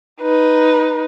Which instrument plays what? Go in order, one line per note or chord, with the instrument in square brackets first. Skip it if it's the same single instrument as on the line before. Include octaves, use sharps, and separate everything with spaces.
[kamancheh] D#4 B4